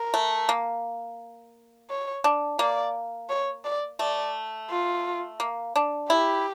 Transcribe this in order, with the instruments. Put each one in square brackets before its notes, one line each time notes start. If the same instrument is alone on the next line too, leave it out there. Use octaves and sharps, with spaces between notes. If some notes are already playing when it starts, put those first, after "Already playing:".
Already playing: [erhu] A#4
[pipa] A3
A#3
[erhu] C#5
[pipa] D4
[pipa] A#3 [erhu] D5
[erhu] C#5
D5
[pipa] A3 [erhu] D5
[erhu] F4
[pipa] A#3
D4
[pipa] E4 [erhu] G4